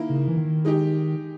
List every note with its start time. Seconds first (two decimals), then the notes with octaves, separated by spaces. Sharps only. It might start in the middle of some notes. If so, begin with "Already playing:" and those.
Already playing: D#3 A#3 E4 A#4
0.10 C#3
0.28 E3
0.37 D#3
0.65 G#3 D#4 G4